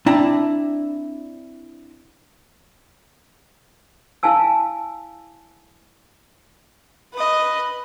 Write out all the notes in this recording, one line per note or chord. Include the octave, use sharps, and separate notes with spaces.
C4 D4 E4 D5 A5 A#5
E4 F5 G#5 A5 E6
B4 D#5